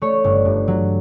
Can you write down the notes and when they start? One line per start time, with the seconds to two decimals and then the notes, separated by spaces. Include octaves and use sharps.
0.02 A3 C#5
0.24 G1
0.45 G2
0.68 F#3